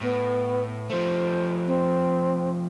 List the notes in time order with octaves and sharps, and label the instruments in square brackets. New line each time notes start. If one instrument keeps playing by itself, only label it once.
[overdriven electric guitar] A2 [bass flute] B3
[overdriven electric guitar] F3 A3 [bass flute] C5
[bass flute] C4